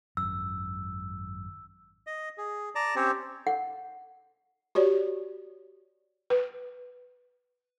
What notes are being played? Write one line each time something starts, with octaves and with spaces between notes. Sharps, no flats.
G#1 F#2 E6
D#5
G#4
D5 A5 A#5
C4 C#4 G4 C5 C#5
F#5
F#4 G4 C#5 D5
B4